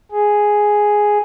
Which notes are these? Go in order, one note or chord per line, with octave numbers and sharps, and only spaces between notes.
G#4